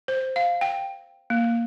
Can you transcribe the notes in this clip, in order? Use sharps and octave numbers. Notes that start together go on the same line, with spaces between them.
C5
F5
G5
A#3